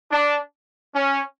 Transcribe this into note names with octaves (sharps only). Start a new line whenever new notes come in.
D4
C#4